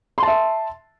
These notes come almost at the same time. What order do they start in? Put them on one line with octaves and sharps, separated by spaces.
C6 A5 E5